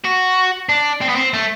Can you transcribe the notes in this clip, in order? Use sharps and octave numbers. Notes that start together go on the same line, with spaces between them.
F#4
D4
C4
B3
C4
A3